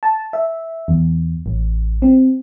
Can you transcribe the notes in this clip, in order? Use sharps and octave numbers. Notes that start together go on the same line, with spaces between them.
A5
E5
E2
A1
C4